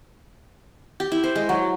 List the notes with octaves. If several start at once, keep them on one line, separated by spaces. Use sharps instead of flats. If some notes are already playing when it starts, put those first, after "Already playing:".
G4
E4
C5
G#3
F#3